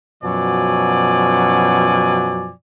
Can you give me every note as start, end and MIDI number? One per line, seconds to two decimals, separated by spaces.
0.23 2.51 42
0.23 2.51 47
0.23 2.51 53
0.23 2.51 54
0.23 2.51 74
0.23 2.51 80